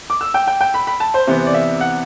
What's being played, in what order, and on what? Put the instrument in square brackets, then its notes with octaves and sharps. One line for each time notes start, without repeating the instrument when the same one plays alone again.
[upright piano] D6
E6
G5
G5
G5
B5
B5
A5
C5
C3 E3 B3 C5
D5
E5
F#5